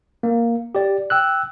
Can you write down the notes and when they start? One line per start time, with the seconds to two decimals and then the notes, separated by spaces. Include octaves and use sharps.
0.23 A#3
0.75 G4 D5
1.10 G5 E6 F#6